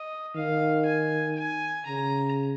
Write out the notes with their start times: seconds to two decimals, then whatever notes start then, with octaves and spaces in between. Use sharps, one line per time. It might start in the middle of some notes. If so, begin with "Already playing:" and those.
Already playing: D#5
0.36 D#3 F5
0.86 G#5
1.35 G#5
1.86 C#3 A#5